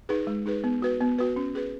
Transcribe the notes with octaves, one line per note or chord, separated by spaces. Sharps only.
D#4 G#4 B4
G#3
D#4 G#4 B4
B3
F#4 B4
B3
F#4 B4
C#4
G#4 B4